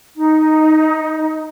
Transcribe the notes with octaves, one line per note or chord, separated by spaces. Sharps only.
D#4